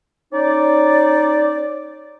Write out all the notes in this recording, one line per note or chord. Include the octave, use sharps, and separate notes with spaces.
C#4 D#4 D5